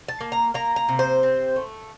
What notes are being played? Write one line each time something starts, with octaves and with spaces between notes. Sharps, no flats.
A5
A#3
A#5
A#3 A#5
A#5
C3
C5
C4
A3